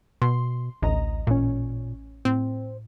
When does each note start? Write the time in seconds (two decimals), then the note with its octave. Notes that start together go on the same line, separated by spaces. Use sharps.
0.22 B2 C6
0.82 A1 D2 D#5 A#5
1.27 A1 A#2 C#4
2.25 A2 C4